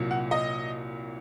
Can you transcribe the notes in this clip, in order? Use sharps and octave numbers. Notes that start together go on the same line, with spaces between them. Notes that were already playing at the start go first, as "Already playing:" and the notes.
Already playing: C2 A#2 F#3
F#5
D#5